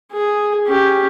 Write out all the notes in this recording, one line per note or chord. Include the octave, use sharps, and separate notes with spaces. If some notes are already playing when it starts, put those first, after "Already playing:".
G#4
C#4 G4